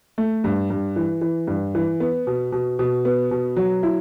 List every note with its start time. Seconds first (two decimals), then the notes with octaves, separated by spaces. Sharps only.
0.18 A3
0.44 G2
0.70 G2
0.96 E3
1.21 E3
1.47 G2
1.75 E3
2.00 B3
2.27 B2
2.52 B2
2.79 B2
3.05 B3
3.31 B2
3.56 F#3
3.83 E4